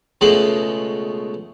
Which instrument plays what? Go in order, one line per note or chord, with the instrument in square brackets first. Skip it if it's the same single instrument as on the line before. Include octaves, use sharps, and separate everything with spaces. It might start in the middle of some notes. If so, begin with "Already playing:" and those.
[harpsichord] C#2 B2 G#3 A3 B5